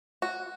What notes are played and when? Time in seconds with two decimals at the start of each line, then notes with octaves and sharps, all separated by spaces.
0.22 F#4